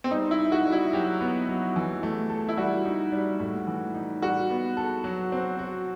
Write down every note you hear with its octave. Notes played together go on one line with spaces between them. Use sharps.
C4
G3 D#4
E4
D#4
F#4
G3
E4
F#3 G4
B3
F#3
E3
A3
A4
E4
G3 F#4
D#4
G3
A2
E3
D#4
G3 F#4
B3
A4
F#3
C4
F#4